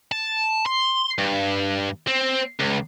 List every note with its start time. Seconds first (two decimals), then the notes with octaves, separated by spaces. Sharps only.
0.12 A5
0.66 C6
1.18 G2
2.07 C4
2.59 C#2